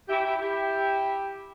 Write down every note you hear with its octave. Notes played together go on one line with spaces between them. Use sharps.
E4 G4
E4 G4
E4 G4